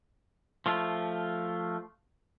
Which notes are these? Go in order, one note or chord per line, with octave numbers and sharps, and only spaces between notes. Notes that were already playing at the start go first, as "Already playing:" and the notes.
F3 A3 F4